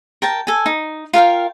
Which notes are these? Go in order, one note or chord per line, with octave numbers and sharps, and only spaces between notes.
A#4 G5 A5
A4 G#5
D#4
F4 A#4 F5 G5